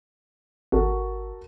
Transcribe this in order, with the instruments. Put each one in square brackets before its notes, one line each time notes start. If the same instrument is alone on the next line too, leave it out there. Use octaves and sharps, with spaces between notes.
[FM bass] G#1 [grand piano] F#4 A4 A#4